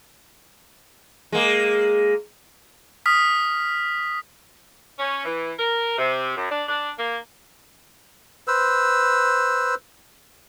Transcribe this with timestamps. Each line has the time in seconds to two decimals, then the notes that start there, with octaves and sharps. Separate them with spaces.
1.32 G#3 A#3
3.06 D#6 F6 B6
4.99 C#4
5.25 E3
5.59 A#4
5.98 C3
6.37 F#2
6.51 D4
6.68 D4
6.99 A#3
8.48 B4 C5 E6